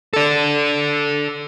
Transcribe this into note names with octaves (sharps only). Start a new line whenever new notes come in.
A4 D5